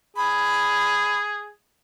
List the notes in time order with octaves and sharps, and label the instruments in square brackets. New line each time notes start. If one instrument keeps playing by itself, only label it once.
[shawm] G#4 [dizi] B5